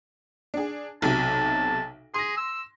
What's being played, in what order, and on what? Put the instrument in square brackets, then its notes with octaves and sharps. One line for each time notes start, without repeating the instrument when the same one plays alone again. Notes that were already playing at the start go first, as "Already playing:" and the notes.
[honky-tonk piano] D4 G#4
[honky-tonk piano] B1 C3 F#3 [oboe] A5
[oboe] G#4 [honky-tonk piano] C6 A#6
[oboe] E6